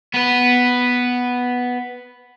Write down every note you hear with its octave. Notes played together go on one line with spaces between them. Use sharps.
B3 B4